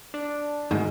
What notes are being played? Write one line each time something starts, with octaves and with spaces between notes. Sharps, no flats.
D4
D2 G#2 D#3